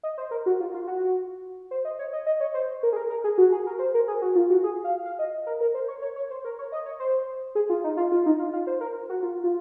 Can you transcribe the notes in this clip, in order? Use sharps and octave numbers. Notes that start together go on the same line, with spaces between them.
D#5
C5
A#4
F#4
F4
F4
F#4
C5
D#5
C#5
D#5
D#5
C#5
C5
A#4
G#4
A#4
A#4
G#4
F#4
G#4
A#4
C5
A#4
G#4
F#4
F4
F#4
G#4
F5
F5
D#5
A#4
A#4
C5
C#5
C#5
C#5
C5
A#4
C#5
D#5
C#5
C5
G#4
F4
D#4
F4
F4
D#4
F4
F4
C5
A#4
F#4
F4
F4